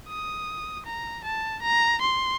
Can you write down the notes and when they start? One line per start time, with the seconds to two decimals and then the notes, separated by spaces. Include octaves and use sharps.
0.08 D#6
0.86 A#5
1.24 A5
1.62 A#5
2.01 C6